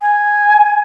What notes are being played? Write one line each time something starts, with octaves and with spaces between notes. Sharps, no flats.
G#5